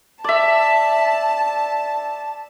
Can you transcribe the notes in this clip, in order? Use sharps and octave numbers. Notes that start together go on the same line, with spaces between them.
D5 E5 A5